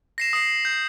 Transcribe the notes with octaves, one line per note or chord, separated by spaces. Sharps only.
A#6 C7 E7
D#6 C7
G6